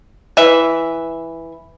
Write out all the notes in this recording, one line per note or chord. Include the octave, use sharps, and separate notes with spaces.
E3 E5